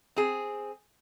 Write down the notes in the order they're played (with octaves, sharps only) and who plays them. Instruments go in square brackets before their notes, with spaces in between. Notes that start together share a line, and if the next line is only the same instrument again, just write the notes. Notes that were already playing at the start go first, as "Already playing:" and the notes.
[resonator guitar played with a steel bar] C4 G#4